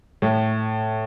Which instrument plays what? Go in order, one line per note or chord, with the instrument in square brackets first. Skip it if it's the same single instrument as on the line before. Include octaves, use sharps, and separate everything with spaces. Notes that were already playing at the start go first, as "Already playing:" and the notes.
[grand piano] A2